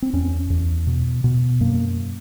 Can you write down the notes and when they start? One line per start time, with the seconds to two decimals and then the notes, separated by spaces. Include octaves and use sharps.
0.02 C4
0.13 E2 C#4
0.50 E2
0.87 B2
1.24 B2
1.60 F#2 A#3